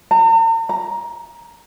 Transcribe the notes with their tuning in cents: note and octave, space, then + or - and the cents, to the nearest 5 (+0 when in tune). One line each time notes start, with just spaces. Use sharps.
A#5 -45
A#5 +15